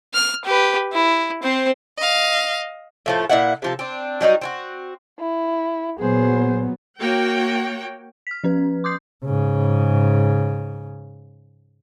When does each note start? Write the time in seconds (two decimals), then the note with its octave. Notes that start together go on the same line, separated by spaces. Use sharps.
0.14 F6
0.45 G4 B4
0.93 E4
1.43 C4 C5
1.98 D#5 F5
3.06 A2 F3 A3
3.30 A#2 D4 E4 F#5
3.62 C3 F3 A4
3.79 C4 D4
4.21 F#3 G3 D#4 F#4
4.41 C4 E4 F#4
5.19 E4
5.99 A#2 F#3 B3 G#4 C5
6.99 A#3 F#4 C#5 G5
8.27 F6 B6
8.44 F3 C#4 B4
8.84 C6 D6 D#6 G6 C7
9.25 G#2 C#3